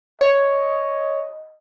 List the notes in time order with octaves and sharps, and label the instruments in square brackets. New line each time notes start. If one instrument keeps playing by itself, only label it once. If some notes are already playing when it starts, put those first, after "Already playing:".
[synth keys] C#5 [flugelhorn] D#5